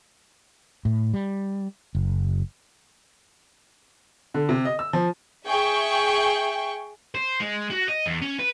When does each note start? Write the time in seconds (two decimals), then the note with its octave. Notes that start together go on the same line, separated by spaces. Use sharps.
0.85 A2
1.14 G3
1.95 F#1
4.34 D3
4.49 C3
4.65 D#5
4.79 E6
4.93 F3
5.47 G#4 E5 G5 C#6
7.15 C5
7.40 G#3
7.71 F#4
7.88 D#5
8.06 E2
8.22 C#4
8.39 B4